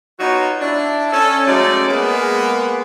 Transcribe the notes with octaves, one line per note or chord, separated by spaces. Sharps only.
B3 D#4 F4 F#4 C#5 A#5
D4 E4
C#4 A4
F#3 G#3 A3 C#4 D#4 D5
G#3 A#3 B3